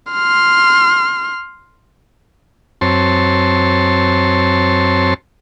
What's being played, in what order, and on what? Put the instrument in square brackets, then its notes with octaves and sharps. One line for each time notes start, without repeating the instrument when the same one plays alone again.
[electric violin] C6 F6
[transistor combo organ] F#2 C4 C#5 A5 C6